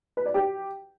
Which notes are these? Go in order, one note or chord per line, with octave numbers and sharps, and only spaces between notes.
B4
D5
G4